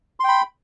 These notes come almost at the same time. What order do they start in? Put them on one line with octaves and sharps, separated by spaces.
C6 G5 B5